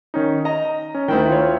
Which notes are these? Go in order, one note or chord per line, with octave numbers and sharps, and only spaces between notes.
D#3 C#4 D#4
D#5 A#5
C#4
D2 D#3 E4 G5
F4 C#5